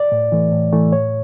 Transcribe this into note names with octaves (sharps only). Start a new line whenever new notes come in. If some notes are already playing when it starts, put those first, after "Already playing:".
Already playing: D5
A2
E3 A3
A2
E3 A3
A2 C#5